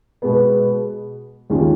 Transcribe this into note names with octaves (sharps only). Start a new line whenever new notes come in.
B2 G#3 B3
D#2 D#3 G#3 C#4 F4